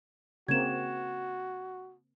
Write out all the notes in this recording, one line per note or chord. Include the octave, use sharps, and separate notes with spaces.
C#3 A#3 C4 F#4 G#6 E7